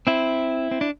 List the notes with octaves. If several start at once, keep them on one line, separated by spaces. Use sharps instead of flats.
C4 E4
C4
D4